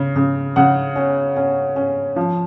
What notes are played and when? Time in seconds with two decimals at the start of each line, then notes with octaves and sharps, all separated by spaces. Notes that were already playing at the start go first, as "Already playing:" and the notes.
Already playing: C#3
0.16 C#3
0.56 C#3 F#5
0.96 C#4
1.36 C#4
1.76 C#4
2.16 F3